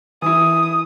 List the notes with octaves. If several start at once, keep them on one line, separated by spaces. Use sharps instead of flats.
E3 E4 D#6